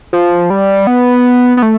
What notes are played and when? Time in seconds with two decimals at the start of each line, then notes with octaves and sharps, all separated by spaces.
0.13 F3
0.50 G3
0.87 B3
1.57 B3
1.63 A3